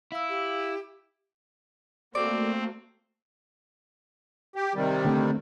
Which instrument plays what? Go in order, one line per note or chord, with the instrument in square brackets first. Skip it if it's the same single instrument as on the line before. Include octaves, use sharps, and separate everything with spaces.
[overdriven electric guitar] E4 [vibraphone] F5 E6
[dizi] G4
[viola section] A3 A#3 F#4 [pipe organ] C4 [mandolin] D5
[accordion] G4
C3 D#3 G3
[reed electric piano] D3 A3 C4